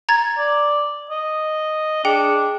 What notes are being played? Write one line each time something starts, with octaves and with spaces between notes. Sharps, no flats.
A#5 G#6 A6
D5
D#5
D4 G#4 G5 C#7